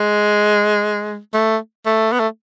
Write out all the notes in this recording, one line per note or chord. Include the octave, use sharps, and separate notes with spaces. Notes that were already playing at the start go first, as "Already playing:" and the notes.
Already playing: G#3
A3
A3
B3
A3